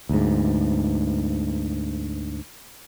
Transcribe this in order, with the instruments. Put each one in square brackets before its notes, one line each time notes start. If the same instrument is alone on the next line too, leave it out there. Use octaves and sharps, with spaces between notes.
[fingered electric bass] D2 G#2